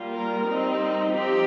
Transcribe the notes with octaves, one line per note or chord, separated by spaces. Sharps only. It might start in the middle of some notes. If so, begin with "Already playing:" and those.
Already playing: G3 A#3 F4
A#4
G3 C4 D#4
F3 C4 D#4 G4